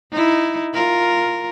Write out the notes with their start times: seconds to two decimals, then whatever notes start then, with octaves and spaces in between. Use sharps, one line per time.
0.12 D#4 E4
0.74 F4 A#4